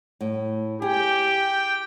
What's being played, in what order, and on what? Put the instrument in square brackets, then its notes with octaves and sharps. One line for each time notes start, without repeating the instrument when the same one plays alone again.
[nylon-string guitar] A2
[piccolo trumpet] G4 [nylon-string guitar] G#4 [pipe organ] G5